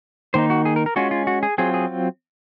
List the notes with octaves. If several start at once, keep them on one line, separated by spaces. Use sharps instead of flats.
D#3 A#3 D#4 C5
F#4
G#4
A#4
A#4
G#3 C#4 F4 F#4
F4
F#4
G#4
F#3 C4 F4 G#4
G#4